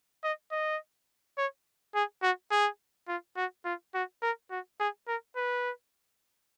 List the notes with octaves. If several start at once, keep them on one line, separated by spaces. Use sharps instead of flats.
D#5
D#5
C#5
G#4
F#4
G#4
F4
F#4
F4
F#4
A#4
F#4
G#4
A#4
B4